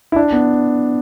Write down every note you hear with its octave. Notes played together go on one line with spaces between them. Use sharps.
E4
D4
B3